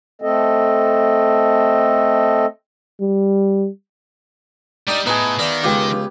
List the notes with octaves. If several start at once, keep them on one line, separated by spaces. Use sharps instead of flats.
A3 C4 A4 D#5
G3
G3 D4 D#4 G4 D#5
A2 B3 D#4 G#4
D#3 D5 E5 F5
C#2 F4 G4